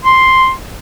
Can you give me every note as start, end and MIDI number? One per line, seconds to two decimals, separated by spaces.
0.04 0.51 84